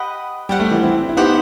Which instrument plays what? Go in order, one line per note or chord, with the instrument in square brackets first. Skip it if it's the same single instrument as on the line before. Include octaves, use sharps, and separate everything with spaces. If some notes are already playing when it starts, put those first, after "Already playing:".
Already playing: [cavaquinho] G4 B4 D#5 F#5
[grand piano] G3 [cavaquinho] G4 C5 F#5
[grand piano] A3
E3 G3
C4 E4
E4
[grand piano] B3 D#4 [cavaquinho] G4 C5 F#5